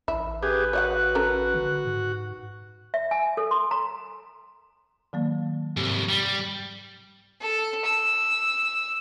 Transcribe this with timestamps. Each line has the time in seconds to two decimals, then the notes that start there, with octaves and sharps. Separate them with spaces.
0.08 A1 E4
0.42 D3 G4 G#4 B4
0.73 F#4 C#5 D#5 F#5
1.15 C#4 A4 A#4
1.54 D3
1.85 G#2
2.94 E5
3.11 G#5
3.37 A4
3.51 C6
3.71 A#5
5.13 D#3 F#3 A#3
5.77 C2 F2 G#2
6.09 G3
7.40 A4
7.85 E6